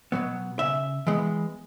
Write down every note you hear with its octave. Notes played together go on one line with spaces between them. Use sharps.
B2 F#3 B3
C#3 E5
E3 G#3 B3